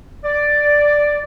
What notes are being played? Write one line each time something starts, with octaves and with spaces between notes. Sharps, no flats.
D5